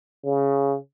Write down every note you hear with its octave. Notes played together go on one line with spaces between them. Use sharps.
C#3